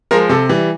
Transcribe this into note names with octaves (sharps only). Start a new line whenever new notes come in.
F3 G#3 A#4
C3 A4
E3 G3